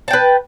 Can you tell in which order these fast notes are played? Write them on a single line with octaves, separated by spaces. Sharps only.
A5 G5 B4